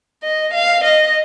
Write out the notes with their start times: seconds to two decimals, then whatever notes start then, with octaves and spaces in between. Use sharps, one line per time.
0.23 D#5
0.53 F5
0.83 D#5